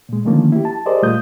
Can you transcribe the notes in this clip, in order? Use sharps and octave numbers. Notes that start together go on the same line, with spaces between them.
A#2 G#3
D3 D#3 F3 A3 A#3 C#4
E4 G4
A5
G4 G#4 A#4 C5 D5 D#5
A#2 G3 A3 F4 D#6 G6